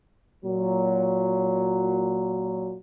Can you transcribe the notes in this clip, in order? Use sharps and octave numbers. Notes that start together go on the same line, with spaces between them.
A#2 F#3